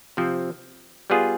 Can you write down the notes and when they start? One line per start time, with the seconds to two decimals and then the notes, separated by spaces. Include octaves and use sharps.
0.17 C3 F3 C4
1.10 G3 B3 F4 G#4